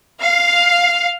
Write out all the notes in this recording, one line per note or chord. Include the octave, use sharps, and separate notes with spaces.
F5